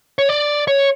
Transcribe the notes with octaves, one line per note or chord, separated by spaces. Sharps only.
C#5
D5
C#5